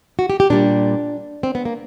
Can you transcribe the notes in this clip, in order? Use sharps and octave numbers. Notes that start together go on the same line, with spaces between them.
F#4
G4
G4
A#2 G3 D4
C4
B3
A#3